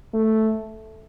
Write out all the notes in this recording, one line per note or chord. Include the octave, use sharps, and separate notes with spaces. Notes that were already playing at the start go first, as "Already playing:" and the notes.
A3